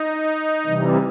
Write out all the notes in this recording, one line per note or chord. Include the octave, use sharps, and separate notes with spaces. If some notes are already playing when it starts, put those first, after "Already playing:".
Already playing: D#4
C3 E3 G3